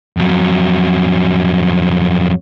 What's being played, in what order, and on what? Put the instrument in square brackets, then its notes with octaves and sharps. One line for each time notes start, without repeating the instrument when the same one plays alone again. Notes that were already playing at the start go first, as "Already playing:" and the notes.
[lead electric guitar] F2 F#3